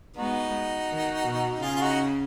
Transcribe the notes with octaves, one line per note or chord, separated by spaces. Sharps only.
G#3 B3 D#4 F#4
D#3
B2
C#3 F4 G#4
F4
D#4 F#4